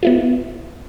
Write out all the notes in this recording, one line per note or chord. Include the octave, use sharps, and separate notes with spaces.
B3 E4 F4